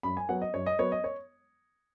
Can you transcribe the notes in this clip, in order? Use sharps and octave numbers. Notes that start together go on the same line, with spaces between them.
F#2 B5
G#5
F#3 B3 F#5
D#5
F#2 C#5
D#5
F#3 B3 C#5
D#5
C#5